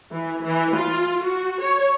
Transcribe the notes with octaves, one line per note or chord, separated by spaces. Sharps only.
E3
E3
F4
F#4
C#5